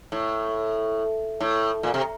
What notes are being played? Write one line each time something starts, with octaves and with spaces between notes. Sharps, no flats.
A2
A2
A#2
C3